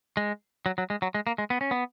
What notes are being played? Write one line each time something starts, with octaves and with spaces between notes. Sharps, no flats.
G#3
F#3
F#3
G#3
F#3
G#3
A#3
G#3
B3
C#4
B3